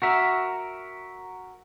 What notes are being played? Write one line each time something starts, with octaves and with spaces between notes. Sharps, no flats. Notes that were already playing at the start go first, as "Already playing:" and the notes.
F#4 A#4 E5